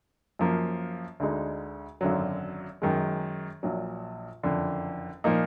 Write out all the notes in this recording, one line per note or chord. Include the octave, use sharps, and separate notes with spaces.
F#2 F3 A#3
D2 D3 G#3 D#4
G#1 F#2 D3 F#3
F#2 D#3 G#3
A#1 A#2 F#3
F#1 F2 D3
A#2 F3 A#3 D#4